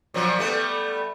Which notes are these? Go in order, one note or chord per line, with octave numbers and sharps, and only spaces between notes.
A#2 F3 F#3
G3 A3 B3